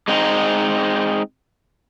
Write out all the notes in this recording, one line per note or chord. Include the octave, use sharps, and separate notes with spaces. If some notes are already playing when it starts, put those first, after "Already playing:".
G#3 C4 D#4